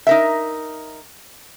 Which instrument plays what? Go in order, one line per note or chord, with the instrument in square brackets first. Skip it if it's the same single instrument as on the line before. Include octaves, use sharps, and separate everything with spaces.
[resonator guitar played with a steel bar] D#4 A#4 E5